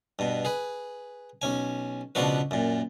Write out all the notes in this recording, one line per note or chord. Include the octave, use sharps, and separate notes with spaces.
G2 B2
G#4 B4
B1 C#4 G#5
C#2 B2 F3 D4 F#4 B4
F#2 A#2